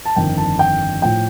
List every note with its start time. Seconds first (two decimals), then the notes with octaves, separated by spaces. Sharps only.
0.06 A5
0.16 G1 F2 D#3 G5
0.38 A5
0.59 G5
1.02 A2 F3 G5